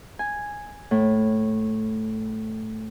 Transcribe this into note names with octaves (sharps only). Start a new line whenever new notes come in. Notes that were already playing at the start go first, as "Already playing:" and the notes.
G#5
A2